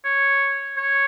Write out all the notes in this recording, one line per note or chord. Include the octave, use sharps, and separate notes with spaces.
C#5
C#5